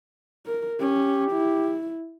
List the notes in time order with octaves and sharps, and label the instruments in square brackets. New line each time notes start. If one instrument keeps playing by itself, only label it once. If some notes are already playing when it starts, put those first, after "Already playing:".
[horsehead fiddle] A#4
[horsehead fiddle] C#4 [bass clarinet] G4
[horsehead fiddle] E4